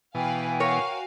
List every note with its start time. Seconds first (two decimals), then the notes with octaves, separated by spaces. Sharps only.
0.15 B2 E3 B4 F5 G5 G#5
0.60 F#4 A#4 C#5 F5